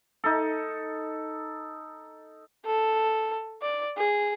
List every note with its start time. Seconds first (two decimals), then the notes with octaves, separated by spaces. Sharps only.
0.24 D#4 A4
2.66 A4
3.62 D5
3.97 G#4